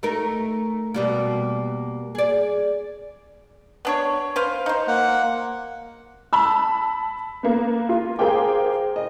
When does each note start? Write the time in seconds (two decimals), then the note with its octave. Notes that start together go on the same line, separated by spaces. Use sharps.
0.03 A3 D#4 A#4
0.94 B2 G3 A#3
2.15 G#4 D5
3.85 B3 D4 C#5
4.36 B4 C5 F5
4.66 D#4 C5
4.88 A#3 F#5
6.33 A5 B5 E6
7.43 A#3 B3
7.89 F4
8.19 G#4 A#4 C5 F5 G5 D6
8.96 D#5